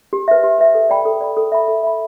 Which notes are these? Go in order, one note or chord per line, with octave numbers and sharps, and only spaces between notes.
G4
B4 E5
G4
B4 E5
A4
D5 G5 B5
A4
D5 G5 B5
A4
E5 B5
A4
E5 B5